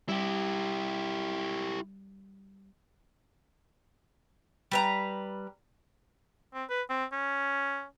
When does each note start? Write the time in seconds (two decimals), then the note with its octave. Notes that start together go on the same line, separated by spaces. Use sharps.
0.09 G3 E4 G4
4.71 G3 B4 A#5
6.54 C4
6.69 B4
6.89 C4
7.12 C#4